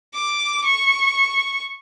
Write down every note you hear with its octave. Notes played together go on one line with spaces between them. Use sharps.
D6
C#6